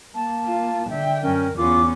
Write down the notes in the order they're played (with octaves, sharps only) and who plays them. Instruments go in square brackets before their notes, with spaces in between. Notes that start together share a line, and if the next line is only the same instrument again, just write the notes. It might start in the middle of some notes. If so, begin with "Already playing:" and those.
[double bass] A#3 [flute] A5
[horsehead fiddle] F4
[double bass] D3 [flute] E5 [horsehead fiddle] G5
[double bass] F#2 [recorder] C#4 [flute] A#4
[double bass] E2 [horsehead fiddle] B3 C#4 [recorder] F4 [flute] D6